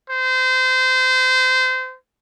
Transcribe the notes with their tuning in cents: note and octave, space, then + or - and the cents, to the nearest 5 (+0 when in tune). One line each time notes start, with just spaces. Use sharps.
C5 -25